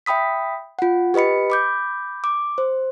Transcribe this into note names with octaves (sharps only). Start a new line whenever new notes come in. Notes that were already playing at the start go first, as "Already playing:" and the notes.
E5 G5 B5 D#6 B6
F4 F#5
G4 B4 D#5 B5 C#7
B5 D6 G6
D6
C5